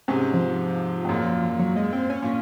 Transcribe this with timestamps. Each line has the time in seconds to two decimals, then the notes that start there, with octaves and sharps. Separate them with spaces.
0.08 G#2 C3 C#4
0.34 F3
1.05 G#2
1.09 F#2 A#2
1.59 F#3
1.76 G#3
1.93 C4
2.10 C#4
2.22 A#2